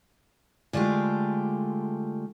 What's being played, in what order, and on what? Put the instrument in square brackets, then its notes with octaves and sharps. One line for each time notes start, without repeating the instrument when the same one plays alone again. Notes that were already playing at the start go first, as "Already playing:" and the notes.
[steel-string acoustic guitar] D3 G#3 A3 F4 G4